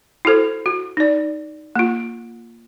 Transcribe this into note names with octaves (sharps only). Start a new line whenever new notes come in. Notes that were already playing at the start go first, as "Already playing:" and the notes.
E4 F#4 A4 C5
F#4
D#4 D5
A#3 F4